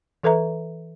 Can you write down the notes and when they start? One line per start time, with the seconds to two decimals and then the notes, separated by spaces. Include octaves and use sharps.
0.23 E3 A4 B4 E5 A#5